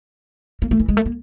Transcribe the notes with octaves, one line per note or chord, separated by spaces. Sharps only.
A#3
A3
E3
G#3
A3
A#3